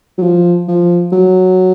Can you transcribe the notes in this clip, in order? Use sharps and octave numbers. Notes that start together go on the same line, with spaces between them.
F#3
F3
F3
F#3